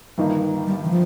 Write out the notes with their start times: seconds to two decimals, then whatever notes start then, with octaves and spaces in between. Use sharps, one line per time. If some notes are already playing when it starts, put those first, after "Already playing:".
0.18 G1 G2 D#3 A#3 D#4
0.66 G3
0.84 D#3
0.90 F3